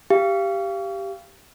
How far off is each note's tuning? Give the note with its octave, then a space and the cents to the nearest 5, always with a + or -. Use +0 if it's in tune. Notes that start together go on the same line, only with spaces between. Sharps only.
G4 +0 F5 -25